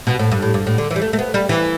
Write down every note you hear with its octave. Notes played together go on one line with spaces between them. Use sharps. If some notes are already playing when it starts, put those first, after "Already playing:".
B2
A2
G2
A2
G2
A2
D3
E3
G3
A3
A3
B3
G3
E3